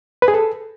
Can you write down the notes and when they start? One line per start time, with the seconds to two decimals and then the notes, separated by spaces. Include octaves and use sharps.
0.22 B4
0.28 G#4
0.34 A4